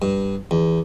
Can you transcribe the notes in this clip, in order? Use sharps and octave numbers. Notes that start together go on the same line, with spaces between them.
G2
E2